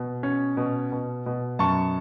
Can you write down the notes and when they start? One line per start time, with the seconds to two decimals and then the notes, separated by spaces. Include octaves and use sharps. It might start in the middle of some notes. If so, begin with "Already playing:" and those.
Already playing: B2
0.23 C#4
0.57 B2
0.92 B2
1.26 B2
1.59 F#2 A5 C#6